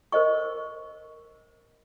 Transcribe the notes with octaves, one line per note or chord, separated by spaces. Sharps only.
A#4 C5 D#5 C#6